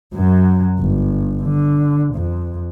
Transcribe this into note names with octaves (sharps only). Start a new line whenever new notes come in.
F#2 F#3
G1
D3
F2